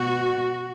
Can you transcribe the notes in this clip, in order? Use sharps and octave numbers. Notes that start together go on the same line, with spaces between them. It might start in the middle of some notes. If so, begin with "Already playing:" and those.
Already playing: B2 F#4